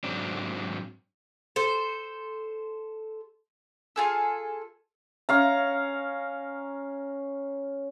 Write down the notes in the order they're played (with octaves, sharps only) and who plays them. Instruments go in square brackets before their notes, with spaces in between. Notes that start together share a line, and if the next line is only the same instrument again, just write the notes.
[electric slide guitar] G#2 F#3 C4 D4
[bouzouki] A4 C5
[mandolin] F4 G#4 A4
[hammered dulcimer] C#4 F5 A#5